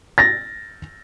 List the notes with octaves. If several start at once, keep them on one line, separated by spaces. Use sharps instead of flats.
A6 A#6